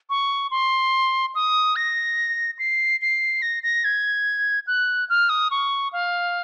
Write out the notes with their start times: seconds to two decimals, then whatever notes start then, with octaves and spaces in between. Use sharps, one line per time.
0.10 C#6
0.51 C6
1.35 D#6
1.76 A#6
2.59 C7
3.02 C7
3.42 A#6
3.63 A#6
3.85 G#6
4.67 F#6
5.10 F6
5.29 D#6
5.51 C#6
5.93 F5